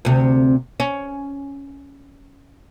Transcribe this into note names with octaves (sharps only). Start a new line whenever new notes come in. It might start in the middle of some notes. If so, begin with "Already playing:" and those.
D2 C3
C#4